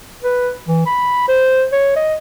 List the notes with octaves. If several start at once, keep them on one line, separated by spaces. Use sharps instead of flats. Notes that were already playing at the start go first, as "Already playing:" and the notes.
B4
E3
B5
C5
C#5
D#5